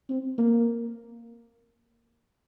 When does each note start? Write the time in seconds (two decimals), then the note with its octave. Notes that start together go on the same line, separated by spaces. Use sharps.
0.10 C4
0.38 A#3